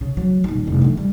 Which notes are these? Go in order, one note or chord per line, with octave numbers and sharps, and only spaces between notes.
C#3
F#3
D#1 D#3
F1 C2
D3 E3
G3